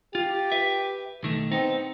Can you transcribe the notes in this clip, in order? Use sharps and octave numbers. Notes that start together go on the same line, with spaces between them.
F4 G4
B4 E5
B1 D#3 A3
B3 C4 D#4